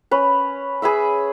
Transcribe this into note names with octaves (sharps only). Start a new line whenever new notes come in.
C#4 B4
G#4 B4 E5 E6